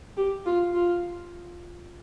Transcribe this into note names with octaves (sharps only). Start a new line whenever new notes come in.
G4
F4
F4